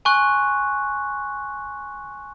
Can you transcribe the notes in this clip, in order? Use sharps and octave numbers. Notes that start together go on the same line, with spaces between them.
G#5 C6 C#6 F#6